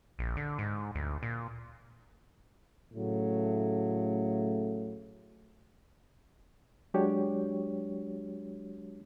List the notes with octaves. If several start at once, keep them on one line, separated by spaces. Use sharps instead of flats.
A#1
D3
G#2
D2
A#2
A2 C#3 F#3 A3
F#3 G#3 D4 F#4 G4 C#5